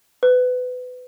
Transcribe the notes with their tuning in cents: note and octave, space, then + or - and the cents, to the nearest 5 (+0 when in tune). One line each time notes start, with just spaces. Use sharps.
B4 +25